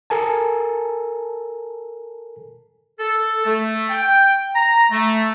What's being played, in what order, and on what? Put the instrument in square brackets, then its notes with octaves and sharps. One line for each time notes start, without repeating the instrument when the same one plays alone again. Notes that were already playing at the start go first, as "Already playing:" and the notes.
[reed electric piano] A4 A#4 G#5 A5
[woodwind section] A4
A3
G5
G5
A#5
A3